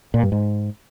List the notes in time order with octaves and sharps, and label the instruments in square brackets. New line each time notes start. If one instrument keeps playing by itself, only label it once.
[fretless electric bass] A#2
G2
G#2